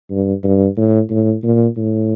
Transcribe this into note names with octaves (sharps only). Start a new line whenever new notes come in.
G2
G2
A2
A2
A#2
A2